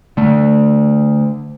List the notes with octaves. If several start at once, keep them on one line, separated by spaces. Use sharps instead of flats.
D3 A3